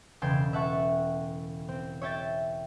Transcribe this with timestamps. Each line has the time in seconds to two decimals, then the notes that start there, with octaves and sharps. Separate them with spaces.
0.22 E1 C#3 A4 G5 C6 G#6
0.53 E5 F#5 A5 C#6
1.69 C4
2.01 C#5 E5 G5 A6